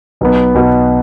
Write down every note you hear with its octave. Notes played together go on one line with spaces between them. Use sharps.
B1 B2 B3
B1 B2 B3